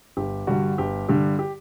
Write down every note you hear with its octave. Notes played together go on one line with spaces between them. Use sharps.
G1 G4
G2 D3 G3 F#4
G1 G4
G2 D3 G3 G4
G4